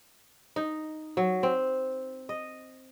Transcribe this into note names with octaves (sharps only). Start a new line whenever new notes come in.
D#4
F#3
C4
D#5